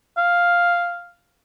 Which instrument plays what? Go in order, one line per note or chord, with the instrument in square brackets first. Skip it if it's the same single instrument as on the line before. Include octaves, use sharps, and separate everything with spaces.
[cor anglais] F5